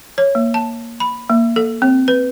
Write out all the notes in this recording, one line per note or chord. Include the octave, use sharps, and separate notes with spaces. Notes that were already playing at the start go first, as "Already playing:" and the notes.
C#5
A#3
A5
B5
A#3
A4
C4
B4